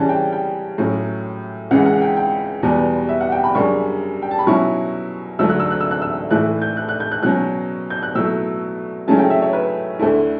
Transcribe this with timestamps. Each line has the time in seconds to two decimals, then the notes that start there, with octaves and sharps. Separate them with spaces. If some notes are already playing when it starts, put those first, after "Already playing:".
Already playing: C#3 E3 G3 C#4 A5
0.09 G5
0.32 G5
0.78 A2 F#3 C#4
1.71 C#2 C#3 E3 F#5
1.86 F#5
2.02 G5
2.17 G5
2.63 E2 B2 G3 B3
3.09 E5
3.21 F#5
3.32 G5
3.44 B5
3.54 F#2 C#3 G3 D4 C#6
4.22 G5
4.31 A5
4.39 B5
4.47 B2 F#3 C#4 E4 C#6
5.39 D2 D3 F#3 A3 E6
5.49 F#6
5.60 E6
5.70 F#6
5.80 E6
5.91 F#6
6.02 E6
6.31 A2 E3 A3 E4 F#6
6.62 G6
6.77 F#6
6.89 F#6
7.00 G6
7.12 F#6
7.23 B2 F#3 C#4 F#6
7.90 G6
8.03 F#6
8.15 B2 F#3 A3 E4 E6
9.08 C#3 F#3 A3 C#4 E4 A5
9.19 G5
9.30 E5
9.42 C#5
9.53 B4
9.99 D2 D3 A3 E4